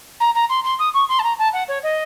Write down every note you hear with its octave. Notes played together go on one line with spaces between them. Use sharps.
A#5
A#5
C6
C6
D#6
C#6
C6
A5
A#5
A5
F#5
C#5
D#5